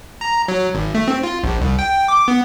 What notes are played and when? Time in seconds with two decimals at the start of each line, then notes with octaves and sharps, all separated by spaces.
0.21 A#5
0.48 F#3
0.75 G#1
0.95 A3
1.08 C4
1.23 F4
1.44 A#1
1.61 C2
1.79 G5
2.08 D6
2.28 B3